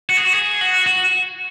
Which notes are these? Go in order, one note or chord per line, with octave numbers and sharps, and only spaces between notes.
F#4
G#4
F#4
G#4
F#4
F#4